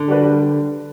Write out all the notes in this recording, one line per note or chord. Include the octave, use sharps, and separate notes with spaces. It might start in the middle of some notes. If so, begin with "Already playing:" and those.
Already playing: D3
G3 D4 F#4 B4
G3